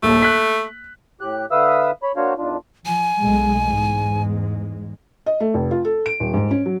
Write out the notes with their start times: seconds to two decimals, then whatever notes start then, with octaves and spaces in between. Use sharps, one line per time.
0.03 D#1 A#1 D#2 A3
0.22 F#6 B6
1.21 A2 G4 F#6
1.51 D3 B4 E5 F5 D#6 E6
2.03 C#5 B5
2.16 A#3 D4 F#4 C5 C#5 F5
2.38 E2 D#3 D4 F4
2.86 F3 G#5
3.20 B1 G#3 A3
3.64 E2 G#2 G#3
5.26 D#5
5.40 A3
5.54 F1
5.71 F4
5.85 A4
6.06 D7
6.20 D#1
6.34 G#2
6.51 C#4
6.66 F#3